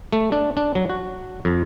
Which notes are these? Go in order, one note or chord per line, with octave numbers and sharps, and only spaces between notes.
A3
D4
D4
F#3
F#4
F2